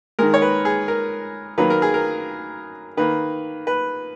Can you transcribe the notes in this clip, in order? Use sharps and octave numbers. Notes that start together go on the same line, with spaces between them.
D#3 G#3 A#4
C#5
B4
G#4
A#4
D#3 F#3 A#3 B4
A#4
G#4
A#4
D#3 A#3 B4
B4